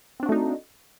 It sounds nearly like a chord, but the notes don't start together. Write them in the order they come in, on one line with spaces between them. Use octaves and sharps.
C4 D4 F#4 A3 D#4